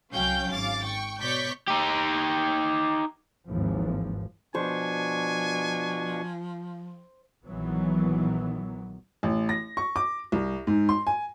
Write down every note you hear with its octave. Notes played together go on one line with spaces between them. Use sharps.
C2 F#3 C#4 F5 G5 G6
G#1 F5 D6 A6
G5 C#6
B2 C#5 D5 C#6 G6 B6
D#4 G4
G#1 D#2 E3 F3
B2 F3 D4 C5 G#5 C#6
A#1 D#3 E3 F#3 B3
A1
A#6
C#6
D6
C2
G#2
C6
G#5